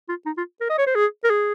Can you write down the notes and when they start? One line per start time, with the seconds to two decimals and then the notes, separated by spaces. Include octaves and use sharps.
0.09 F4
0.26 D#4
0.38 F4
0.61 A#4
0.69 D#5
0.78 C#5
0.87 C5
0.95 G#4
1.24 A#4
1.30 G#4